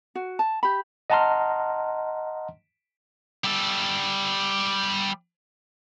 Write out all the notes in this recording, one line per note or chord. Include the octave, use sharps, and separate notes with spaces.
F#4
A5
G4 B5
D#5 F#5 A5 A#5 C6 F6
G3 A4